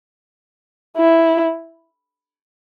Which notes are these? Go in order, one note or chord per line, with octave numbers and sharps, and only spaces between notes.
E4